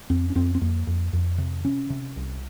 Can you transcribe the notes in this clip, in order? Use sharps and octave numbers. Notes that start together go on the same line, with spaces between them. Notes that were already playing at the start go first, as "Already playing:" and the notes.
F2 C4
C#4
F2 C4
C4
F2 A#3
F2
F2
C3
C3 C#4
C3
C2